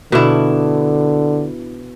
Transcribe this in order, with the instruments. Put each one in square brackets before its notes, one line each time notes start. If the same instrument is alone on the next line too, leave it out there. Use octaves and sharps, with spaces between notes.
[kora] B2 D4 E4 [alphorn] D3